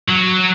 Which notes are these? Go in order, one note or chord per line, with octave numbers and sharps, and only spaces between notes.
F#3